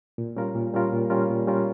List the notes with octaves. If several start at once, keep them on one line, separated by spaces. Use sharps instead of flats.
A#2
G3 C#4 F4 A#4
A#2
G3 C#4 F4 A#4
A#2
G3 C#4 F4 A#4
A#2
G3 C#4 F4 A#4